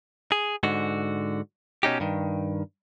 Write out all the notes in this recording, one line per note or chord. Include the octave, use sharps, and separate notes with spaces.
G#4
G#2 D3 F#4
B2 C#4 D#4 G4
G2 D#3